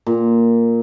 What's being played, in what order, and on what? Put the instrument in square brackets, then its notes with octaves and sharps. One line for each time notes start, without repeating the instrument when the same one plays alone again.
[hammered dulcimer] A#2